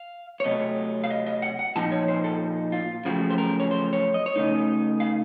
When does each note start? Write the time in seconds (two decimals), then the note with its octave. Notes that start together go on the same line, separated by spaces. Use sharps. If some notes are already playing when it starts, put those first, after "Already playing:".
Already playing: F5
0.40 C#5
0.44 C3 F#3 A3 D#5
1.04 F5
1.10 D#5
1.27 D#5
1.42 F#5
1.59 F#5
1.76 A#2 F3 C4 D#4 A5
1.92 C#5
2.08 C5
2.24 A4
2.72 F4
3.05 F#2 C#3 F3 A3 C4 F#4
3.30 C5
3.38 A#4
3.60 C#5
3.71 C5
3.93 C#5
4.14 D#5
4.26 C#5
4.36 C#3 A3 D#4 D#5
5.00 F5